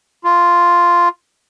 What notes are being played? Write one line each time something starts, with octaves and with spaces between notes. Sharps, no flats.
F4